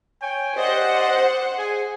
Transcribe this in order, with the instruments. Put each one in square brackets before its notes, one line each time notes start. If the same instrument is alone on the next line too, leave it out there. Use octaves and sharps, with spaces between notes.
[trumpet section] C#5 G5 G#5
[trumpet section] G4 D5 D#5 [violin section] C5 F#5
[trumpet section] G#4 G#5